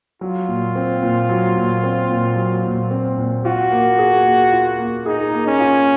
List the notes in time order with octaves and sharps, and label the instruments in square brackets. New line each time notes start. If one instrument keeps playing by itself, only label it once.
[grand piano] F#3 [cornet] F4
[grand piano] A#2
C4
A#2
F#3
A#2
C4
A#2
F#3
A#2
C4
A#2
[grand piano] F4 [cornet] F#4
[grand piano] A#3
G#4
A#3
F4
A#3
[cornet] D#4 [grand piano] G#4
[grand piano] A#3
[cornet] C#4
[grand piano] F4